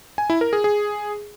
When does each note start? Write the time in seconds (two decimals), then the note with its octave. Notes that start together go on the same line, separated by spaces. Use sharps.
0.18 G#5
0.30 E4
0.41 A#4
0.53 G#4
0.64 G#4